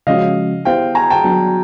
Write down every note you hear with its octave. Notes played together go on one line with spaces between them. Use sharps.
C#3 F3 G#3 C#4 F#4 D#5 F5
B3 E4 G4 C5 F5 G5
G#5 A#5
G5 A5
F#3 B3 D4 F#4